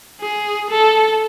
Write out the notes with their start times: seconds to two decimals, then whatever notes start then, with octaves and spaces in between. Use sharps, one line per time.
0.21 G#4
0.70 A4